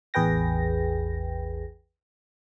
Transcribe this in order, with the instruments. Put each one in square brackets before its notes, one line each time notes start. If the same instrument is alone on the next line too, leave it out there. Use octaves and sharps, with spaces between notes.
[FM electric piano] A1 E2 G#4 B4 G5 A#6